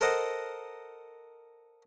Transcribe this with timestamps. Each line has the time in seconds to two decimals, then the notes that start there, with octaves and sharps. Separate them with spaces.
0.01 A4 A#4 C5 D#5 F#5